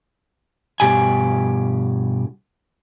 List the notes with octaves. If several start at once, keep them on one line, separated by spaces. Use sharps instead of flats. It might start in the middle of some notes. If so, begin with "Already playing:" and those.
G2 B2 G4 G#5